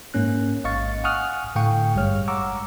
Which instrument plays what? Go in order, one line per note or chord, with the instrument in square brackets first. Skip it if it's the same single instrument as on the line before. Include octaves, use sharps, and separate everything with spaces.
[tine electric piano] G#2 A#3 C#4 F#6
A1 D#5 F5 C#6 A6
F#5 G#5 C#6 D#6 F6 F#6
A2 D3 A3 F5 G5 C#6
G#1 G2 G3 G#3 C#5 F6
F#5 A#5 C#6 D6 E6